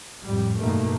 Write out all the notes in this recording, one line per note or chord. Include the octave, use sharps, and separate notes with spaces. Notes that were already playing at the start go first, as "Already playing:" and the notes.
F2 A2 G3
G2 B2 D#3 A3 A#3